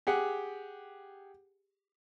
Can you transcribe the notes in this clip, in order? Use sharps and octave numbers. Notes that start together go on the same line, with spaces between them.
G4 G#4 F#5